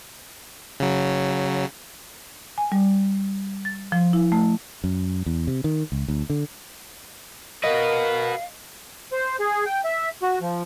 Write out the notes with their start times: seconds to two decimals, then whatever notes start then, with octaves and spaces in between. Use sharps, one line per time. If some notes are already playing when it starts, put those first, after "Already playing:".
0.80 C#3 F#3
2.58 G#5
2.72 G3
3.65 A6
3.92 F3
4.13 E4
4.32 A3
4.84 F#2
5.26 E2
5.47 C3
5.64 D#3
5.92 C#2
6.08 D2
6.30 D3
7.63 F#4 A#4 B4 D#5 F5
9.12 C5
9.40 G#4
9.66 G5
9.85 E5
10.22 F#4
10.41 F3